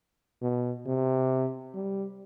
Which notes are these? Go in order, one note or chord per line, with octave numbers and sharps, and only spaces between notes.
B2
C3
G3